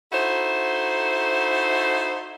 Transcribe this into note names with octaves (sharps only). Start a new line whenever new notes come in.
D#4 E4 F#4 A4 C5